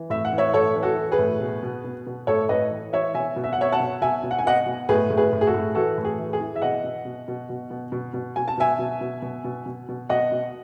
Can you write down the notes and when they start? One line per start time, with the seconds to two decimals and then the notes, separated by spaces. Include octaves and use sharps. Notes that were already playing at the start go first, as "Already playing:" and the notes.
Already playing: E3
0.10 A2 E5
0.25 F#5
0.33 E3
0.38 C#5 E5
0.53 A2 A4 C#5
0.76 E3
0.83 F#4 A4
0.98 E3
1.12 G#4 B4
1.19 A2
1.41 B2
1.63 B2
1.85 B2
2.07 B2
2.27 A2 A4 C#5
2.49 A2 B4 D#5
2.71 E3
2.93 E3 C#5 E5
3.14 B2 E5 G#5
3.36 B2
3.44 E5
3.53 F#5
3.58 B2 C#5 E5
3.72 F#5 A5
3.80 B2
4.01 B2 E5 G#5
4.23 B2
4.31 F#5
4.39 G#5
4.45 B2 D#5 F#5
4.66 B2
4.89 A2 G#4 B4
5.10 A2
5.17 G#4 B4
5.33 A2
5.41 G#4
5.47 F#4 A4
5.54 A2
5.75 E3 F#4 A4
5.98 A2
6.05 G#4
6.19 E3
6.33 G#4
6.40 E3
6.56 E5
6.62 B2 D#5 F#5
6.84 B2
7.05 B2
7.28 B2
7.50 B2
7.71 B2
7.92 B2
8.14 B2
8.36 B2 G#5
8.48 A5
8.58 B2 E5 G#5
8.79 B2
9.01 B2
9.22 B2
9.44 B2
9.66 B2
9.89 B2
10.09 B2 D#5 F#5
10.32 B2